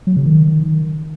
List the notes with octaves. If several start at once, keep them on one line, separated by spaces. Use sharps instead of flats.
F#3
C#3
D#3